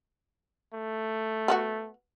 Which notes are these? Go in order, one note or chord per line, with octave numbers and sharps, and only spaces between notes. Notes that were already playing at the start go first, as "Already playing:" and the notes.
A3
B3 C4 F#4